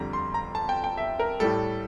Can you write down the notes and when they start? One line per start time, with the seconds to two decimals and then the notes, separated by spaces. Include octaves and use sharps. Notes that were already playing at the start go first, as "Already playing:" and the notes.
Already playing: F2 D3 G3 A#5
0.13 C6
0.34 A#5
0.55 A5
0.69 G5
0.84 G5
0.97 E5
1.19 A#4
1.40 A2 G3 A4